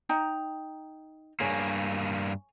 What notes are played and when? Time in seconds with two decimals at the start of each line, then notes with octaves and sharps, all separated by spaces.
0.09 D#4 G5 A#5
1.40 G2 A#3 G#4 C#5